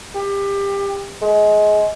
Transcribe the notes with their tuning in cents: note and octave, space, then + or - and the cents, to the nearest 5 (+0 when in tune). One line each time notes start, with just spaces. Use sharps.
G4 +25
G#3 +25